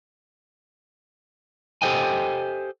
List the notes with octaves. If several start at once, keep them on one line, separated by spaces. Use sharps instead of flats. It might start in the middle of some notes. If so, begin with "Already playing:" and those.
G4 A4 C5 D#5 G5 G#5